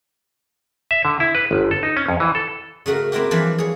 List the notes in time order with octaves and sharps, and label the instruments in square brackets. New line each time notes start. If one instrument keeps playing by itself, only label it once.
[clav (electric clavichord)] E5
D3
E4
B4
G1
A4
D#4
C#4
F2
E3
A4
[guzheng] C#3 A3 F#4 A#4
A#3 C4 E4 F#4 G4
E3 F3 G3 D4 B4
G#4 C#5